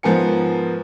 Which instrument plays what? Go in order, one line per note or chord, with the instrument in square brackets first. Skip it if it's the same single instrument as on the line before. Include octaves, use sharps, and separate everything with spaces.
[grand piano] G#2 F3 B3 A#4 G#5 C#7